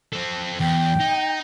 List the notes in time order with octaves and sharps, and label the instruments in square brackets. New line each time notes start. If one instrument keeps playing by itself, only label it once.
[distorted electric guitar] C4 A4
[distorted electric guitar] E2 [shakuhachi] G5
[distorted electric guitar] D#4